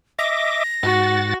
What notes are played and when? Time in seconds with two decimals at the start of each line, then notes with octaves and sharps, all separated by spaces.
0.19 D#5 E5 D6 A#6
0.83 G#2 F#4 F#5 A6